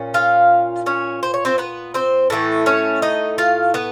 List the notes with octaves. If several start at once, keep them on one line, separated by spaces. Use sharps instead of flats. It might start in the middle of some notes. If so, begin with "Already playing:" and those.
Already playing: A#2 C#4
F4 F5
C#4 C#5
C5
C#5
C4 C5
B3 B4
C4 C5
A2 E3 A3
C#4 C#5
D#4 D#5
F4 F5
B3 B4